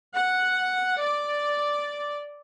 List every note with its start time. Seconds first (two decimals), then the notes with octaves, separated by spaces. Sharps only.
0.14 F#5
1.03 D5